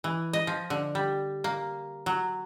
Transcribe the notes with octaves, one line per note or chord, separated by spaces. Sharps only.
E3
D#5
F3
D3
G3
A#3
F#3